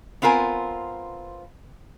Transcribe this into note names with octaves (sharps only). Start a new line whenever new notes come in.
B3 C4 F4 A#4 G#5